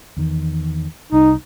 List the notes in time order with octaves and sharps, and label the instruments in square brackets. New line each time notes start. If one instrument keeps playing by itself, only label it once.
[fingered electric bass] E2 D#3
[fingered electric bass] C2 [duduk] D#4